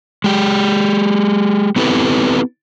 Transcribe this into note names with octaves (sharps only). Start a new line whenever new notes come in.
G#3 G4
B3 C4 E4 G4 A4 B4